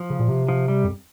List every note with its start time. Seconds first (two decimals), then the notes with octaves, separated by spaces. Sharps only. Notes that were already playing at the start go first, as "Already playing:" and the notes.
Already playing: F3
0.10 C#3
0.20 A#2
0.28 C3
0.48 F3
0.68 G3
0.84 F2